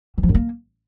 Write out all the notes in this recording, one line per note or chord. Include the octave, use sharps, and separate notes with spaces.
E3
F3
F#2
A#3